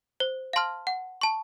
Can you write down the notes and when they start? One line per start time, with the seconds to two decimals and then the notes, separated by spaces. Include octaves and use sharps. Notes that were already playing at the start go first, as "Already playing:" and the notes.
0.20 C5
0.53 F5 A5 C6 F6
0.87 F#5
1.21 A5 C#6